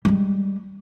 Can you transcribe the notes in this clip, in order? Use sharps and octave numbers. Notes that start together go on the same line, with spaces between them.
G3 G#3